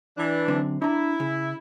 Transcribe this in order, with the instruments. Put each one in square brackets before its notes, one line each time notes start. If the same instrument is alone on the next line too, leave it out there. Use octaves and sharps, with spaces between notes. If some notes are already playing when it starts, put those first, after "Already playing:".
[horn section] E3 D4
[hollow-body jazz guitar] F#2 D3 C4
[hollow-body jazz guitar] D4 A#5 [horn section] E4
[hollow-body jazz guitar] C#3